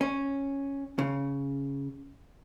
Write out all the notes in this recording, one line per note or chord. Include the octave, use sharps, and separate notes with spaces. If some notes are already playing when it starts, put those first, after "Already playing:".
C#4
C#3